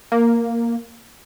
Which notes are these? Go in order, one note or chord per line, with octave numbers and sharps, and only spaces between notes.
A#3